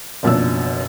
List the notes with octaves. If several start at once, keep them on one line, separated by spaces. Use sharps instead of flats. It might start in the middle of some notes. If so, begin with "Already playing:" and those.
F#1 F#2 B2 F3 D4 E6